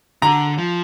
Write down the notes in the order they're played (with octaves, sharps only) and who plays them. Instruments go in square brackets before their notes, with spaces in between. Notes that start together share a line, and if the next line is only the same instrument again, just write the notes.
[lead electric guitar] D3 [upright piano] A#5
[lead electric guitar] F3